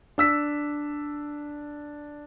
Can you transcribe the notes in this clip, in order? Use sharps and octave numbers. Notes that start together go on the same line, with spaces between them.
D4 E6 B6